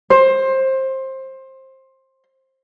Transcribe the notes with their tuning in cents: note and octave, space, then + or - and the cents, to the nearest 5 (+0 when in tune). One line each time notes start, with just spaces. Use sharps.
C5 +20